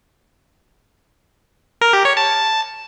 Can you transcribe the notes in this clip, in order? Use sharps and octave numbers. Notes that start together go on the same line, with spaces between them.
A#4
G4
C#5
A5